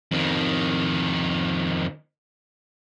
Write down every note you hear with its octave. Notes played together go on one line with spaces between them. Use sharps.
F2 D#3